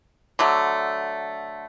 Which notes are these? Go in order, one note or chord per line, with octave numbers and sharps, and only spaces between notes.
D3 F#3 A3